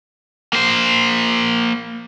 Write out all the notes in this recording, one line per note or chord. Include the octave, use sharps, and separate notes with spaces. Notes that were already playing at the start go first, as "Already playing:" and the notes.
A#3 C5